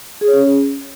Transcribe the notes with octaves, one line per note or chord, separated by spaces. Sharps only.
G#4
C#5
C#4